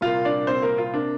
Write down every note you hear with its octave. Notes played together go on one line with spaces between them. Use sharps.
C2 A#2 A#3 F4 F5
D4 D5
C4 C5
A#3 A#4
F4
C3 A#3 D4